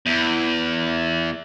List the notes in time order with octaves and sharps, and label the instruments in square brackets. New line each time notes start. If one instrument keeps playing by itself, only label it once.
[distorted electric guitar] E2